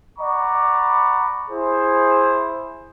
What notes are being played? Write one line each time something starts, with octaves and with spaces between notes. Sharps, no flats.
D5 F#5 A#5 B5 C#6 D6
E4 G#4 C5